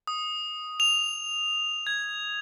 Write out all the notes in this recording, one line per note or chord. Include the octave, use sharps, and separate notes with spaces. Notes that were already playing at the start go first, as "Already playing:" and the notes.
D#6
F7
G#6